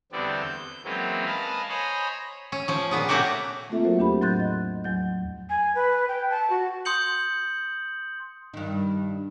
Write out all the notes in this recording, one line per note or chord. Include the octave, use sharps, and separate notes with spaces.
E2 D3 G3 B3 C4 D5
G6
E3 F#3 G#3 A#3 C4 C#4
A#4 B4 D#5 F5 G#5 A5
C5 C#5 D#5 G#5 A#5 B5
C#4
F3 C#4
A#2 B3 G#4
A3 A#3 C#4 F#4 G4
A3 A#3 C4 F4 A4 E5
F#3 F#4 A#4 C5
E2 D4 G4 B5
A2 F#3 C6 F#6 G6 A6
D#5
E2 F#3 G6
G#5
B4
G5
A5
F#4
C6 D#6 G6 C#7 F#7
G2 D#3